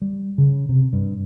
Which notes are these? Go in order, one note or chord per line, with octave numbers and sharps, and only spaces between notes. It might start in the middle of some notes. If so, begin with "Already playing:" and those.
G3
C#3
C3
G2